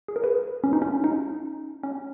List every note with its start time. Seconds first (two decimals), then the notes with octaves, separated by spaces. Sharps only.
0.08 G#4
0.16 A#4
0.24 B4
0.64 C#4
0.73 D#4
0.82 C#4
1.04 D#4
1.83 C#4